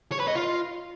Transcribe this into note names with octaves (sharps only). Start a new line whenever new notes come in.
C#5
B4
D#5
F4